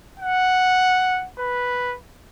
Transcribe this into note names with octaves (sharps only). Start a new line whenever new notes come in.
F#5
B4